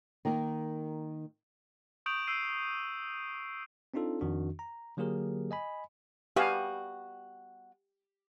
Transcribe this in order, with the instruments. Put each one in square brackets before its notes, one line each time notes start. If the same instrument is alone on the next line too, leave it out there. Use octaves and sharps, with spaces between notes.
[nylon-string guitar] D#3 A#3 D#4 A#4
[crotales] C#6 D#6 G6 D7 F7 F#7
E6 G6 C7 D#7
[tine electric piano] C4 D4 D#4 F4 A4
F2 D#3 D4 F#4
A#5
D3 F#3 A#3 G4 G#4 A#4
D#5 G#5 B5
[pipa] G3 B3 F#4 [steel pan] G4 F5 G#5